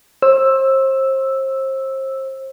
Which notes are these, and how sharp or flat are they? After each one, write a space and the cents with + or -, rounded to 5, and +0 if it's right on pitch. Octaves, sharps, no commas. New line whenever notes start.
C5 +35 E6 +0